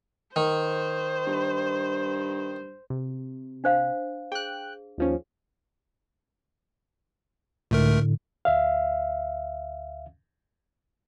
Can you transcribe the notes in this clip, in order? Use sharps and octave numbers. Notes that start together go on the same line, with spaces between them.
D#3 C5
G2
C3
D4 C5 F5
G#4 G5 F#6
D#2 F3 C#4
C#2 A2 D3 A3 A#4
D2 E5 F5